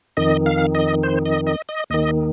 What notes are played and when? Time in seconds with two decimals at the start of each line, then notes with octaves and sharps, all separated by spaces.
0.17 F2 D#3 D#5
0.46 F5
0.75 D#5
1.03 C5
1.26 D#5
1.47 D#5
1.69 D#5
1.90 D#2 D#3 D#5